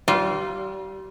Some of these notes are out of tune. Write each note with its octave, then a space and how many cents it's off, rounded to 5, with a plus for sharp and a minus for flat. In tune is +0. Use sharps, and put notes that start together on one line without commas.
G3 -35 F4 +0